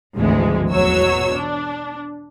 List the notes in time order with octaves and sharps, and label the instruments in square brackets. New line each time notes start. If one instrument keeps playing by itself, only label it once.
[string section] G#1 D2 E3 F3 G#3
E2 B2 F#3 C#5 E6
D4